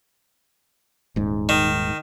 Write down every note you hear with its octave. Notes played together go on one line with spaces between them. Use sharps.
D#1 G#2
D#3